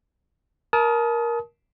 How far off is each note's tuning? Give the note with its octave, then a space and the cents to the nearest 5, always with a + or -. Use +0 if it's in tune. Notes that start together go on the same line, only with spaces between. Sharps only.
A#4 +10 A5 -30 D#6 +25